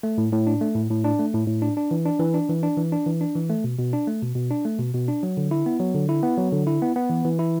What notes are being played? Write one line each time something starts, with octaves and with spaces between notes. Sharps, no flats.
A3
A2
A2
D4
A3
A2
A2
D4
A3
A2
A2
D4
D4
E3
D4
E3
D4
E3
D4
E3
D4
E3
D4
E3
A3
B2
B2
D4
A3
B2
B2
D4
A3
B2
B2
D4
F#3
D3
E4
B3
F#3
D3
E4
B3
F#3
D3
E4
B3
B3
E3
E3
E4